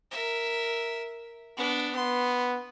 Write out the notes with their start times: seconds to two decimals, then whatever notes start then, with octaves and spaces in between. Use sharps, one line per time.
0.11 A#4 E5
1.57 B3 D4
1.95 B3 C6